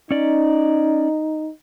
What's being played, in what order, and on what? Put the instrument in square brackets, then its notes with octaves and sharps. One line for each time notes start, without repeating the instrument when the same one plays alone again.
[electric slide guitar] C#4 D5 [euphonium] D#4